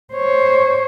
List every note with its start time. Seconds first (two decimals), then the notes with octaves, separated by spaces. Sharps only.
0.14 C5 C#5